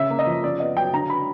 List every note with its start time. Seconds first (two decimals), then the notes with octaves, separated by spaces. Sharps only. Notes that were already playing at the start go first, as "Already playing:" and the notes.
Already playing: C#3 E5
0.10 A#3
0.19 D#5
0.26 F3
0.43 C#3 D5
0.60 B3 D#5
0.76 F#3 G5
0.93 D3 A#5
1.10 B5